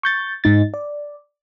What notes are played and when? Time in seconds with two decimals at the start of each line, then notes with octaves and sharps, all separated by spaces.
0.03 C#6 G6 A6
0.44 G#2 D#4 A6
0.74 D5